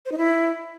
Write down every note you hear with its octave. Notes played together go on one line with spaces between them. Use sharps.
C5
D#4
E4